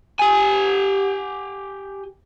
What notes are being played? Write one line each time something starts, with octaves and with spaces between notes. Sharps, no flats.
G4 G#5